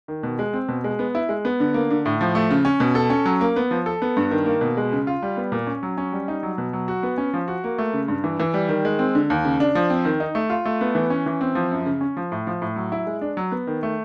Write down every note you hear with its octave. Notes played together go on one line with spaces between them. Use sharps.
D#3
B2
G#3
C4
B2
G#3
B3
E4
G#3
B3
D3
A#3
D3
A2
F3
A3
C#3
C#4
B2
A4
C#4
F#3
A#3
B3
F3
A4
B3
G2
D#3
A#3
B2
G#3
C#3
F4
G3
B3
A#2
C#4
F#3
C#4
G3
D#4
F#3
B2
F#3
F#4
B3
C#4
F3
F#4
A#3
A3
C#3
G2
E3
E3
G3
D#3
G#3
C4
D3
D#2
C#3
D4
F3
C4
D#3
D#4
A3
F4
A3
B3
E3
C#4
E3
C4
F3
F#2
C#3
C#4
F3
A2
F3
A2
F#3
E4
G#3
D4
F#3
B3
D#3
A3